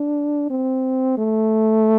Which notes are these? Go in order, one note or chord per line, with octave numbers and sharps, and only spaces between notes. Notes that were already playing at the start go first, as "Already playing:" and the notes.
Already playing: D4
C4
A3